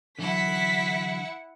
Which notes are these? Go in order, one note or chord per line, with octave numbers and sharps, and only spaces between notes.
D3 E3 F#3 E4 F#5 B6